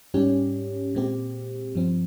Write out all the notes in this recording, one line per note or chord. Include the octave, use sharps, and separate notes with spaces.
G#2 G3 C#4 G4
A#2 G#3 C4 G4
G2 F3 C4